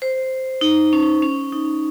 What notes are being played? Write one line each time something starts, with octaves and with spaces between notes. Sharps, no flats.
C5
D#4
C#4
C#4
D#4